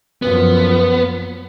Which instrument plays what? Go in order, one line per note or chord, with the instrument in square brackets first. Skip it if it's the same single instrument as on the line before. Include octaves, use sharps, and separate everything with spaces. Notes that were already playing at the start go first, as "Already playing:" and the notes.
[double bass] F#2 F3 [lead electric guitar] B3